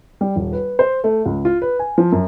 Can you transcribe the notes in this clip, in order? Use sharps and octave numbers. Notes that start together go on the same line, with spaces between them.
G3
D#1
B4
C5
A3
C#2
F4
B4
G#5
F3
F#2